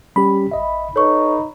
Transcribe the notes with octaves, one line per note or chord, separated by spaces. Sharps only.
G3 C#4 G4 B5
A1 D#5 E5
D#4 A4 B4 C#5 C#6